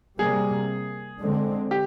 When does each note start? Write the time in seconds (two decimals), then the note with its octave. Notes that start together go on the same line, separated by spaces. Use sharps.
0.19 C3 G3 A#3 G#4
1.21 D3 G#3 C4
1.71 G4